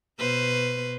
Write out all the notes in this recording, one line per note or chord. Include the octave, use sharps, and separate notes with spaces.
B2 B4 C5